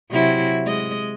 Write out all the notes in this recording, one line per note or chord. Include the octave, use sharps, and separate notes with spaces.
C3 F#3 E4
G#3 D#5